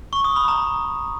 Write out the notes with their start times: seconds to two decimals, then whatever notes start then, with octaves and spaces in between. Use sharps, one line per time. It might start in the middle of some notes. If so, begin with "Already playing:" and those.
0.13 C#6
0.24 D#6
0.36 B5
0.48 A#5